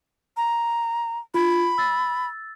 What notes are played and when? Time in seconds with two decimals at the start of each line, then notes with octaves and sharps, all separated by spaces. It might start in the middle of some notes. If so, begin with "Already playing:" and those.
0.37 A#5
1.34 F4 B5
1.78 E6 A6